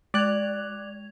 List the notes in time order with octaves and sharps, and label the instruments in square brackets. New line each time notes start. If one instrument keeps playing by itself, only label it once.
[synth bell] G#3 G#6 F7 [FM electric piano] D5 F#6